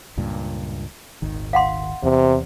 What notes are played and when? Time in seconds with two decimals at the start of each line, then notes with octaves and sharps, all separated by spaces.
0.17 C#2 G2 A#2
1.22 D#1 G#1 D#3
1.53 F5 F#5 C6
2.03 E2 C3